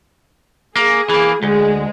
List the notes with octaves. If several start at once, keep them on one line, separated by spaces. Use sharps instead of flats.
A#3 G#4
E3 A#3
D2 G#3